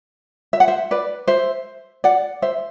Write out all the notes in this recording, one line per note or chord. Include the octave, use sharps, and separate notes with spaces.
E5
F#5
C5 E5
B4 D5
C5 E5
D5 F#5
C5 E5